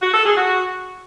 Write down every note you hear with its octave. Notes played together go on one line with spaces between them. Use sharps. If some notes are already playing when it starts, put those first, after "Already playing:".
F#4
A4
G#4
F#4